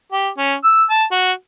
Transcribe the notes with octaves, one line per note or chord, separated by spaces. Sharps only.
G4
C#4
E6
A5
F#4